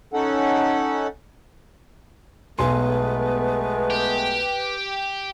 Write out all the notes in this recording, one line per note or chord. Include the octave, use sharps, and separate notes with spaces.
C#4 D#4 A4 F#5
B1 G#3 A3 B3 B4 G#5 C6
G4